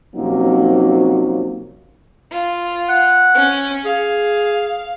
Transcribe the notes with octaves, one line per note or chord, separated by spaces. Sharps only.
C3 F3 F#3 A#3 C#4 D#4
F4
F#5
C#4
G#4 F5